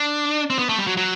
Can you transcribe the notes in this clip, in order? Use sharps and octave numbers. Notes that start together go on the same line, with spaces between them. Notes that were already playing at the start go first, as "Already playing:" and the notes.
Already playing: D4
C4
B3
A3
G3
F#3
F#3